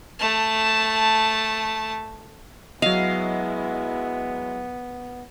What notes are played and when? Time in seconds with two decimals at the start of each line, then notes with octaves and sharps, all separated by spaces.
0.19 A3 A5
2.82 F#3 G#3 B3 E4 D#5 F5